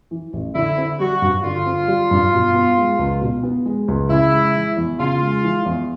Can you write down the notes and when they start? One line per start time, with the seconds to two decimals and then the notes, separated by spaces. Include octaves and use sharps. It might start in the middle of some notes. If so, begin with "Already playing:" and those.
0.11 E3
0.33 A1
0.55 D3 E4
0.78 C4
0.99 G3 F#4
1.22 G2
1.43 D3 F4
1.66 C4
1.88 G3
2.11 G2
2.33 B2
2.54 B3
2.78 G#3
2.99 C#2
3.21 B2
3.43 B3
3.65 G#3
3.88 C#2
4.10 C#3 E4
4.33 G#3
4.55 E3
4.77 E2
4.99 C#3 F4
5.21 G#3
5.44 E3
5.66 E2